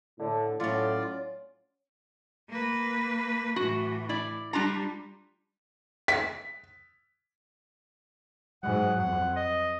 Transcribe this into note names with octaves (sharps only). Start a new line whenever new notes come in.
A2 D3
A2 F#3 C#4 F4 D5
A#3 B4
A2 E3 F#4
E4 D5
G3 D4 F4 A#5
B6
G#2 F#3 F#5
F2 F#5
D#5